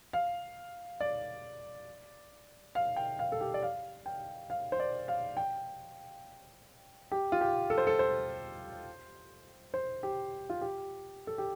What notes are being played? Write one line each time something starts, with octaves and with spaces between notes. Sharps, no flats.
F5
D5
F5
G5
F5
A4
G4
D5
F5
G5
F5
C5
D5
F5
G5
G4
F4
G4
A4
C5
A4
C5
C5
G4
F4
G4
A4
G4